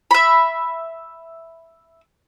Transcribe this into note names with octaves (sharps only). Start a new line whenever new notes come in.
E5 B5